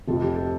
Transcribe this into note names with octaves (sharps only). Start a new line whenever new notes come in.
F1 F2 C3 F3 A4
G4
A4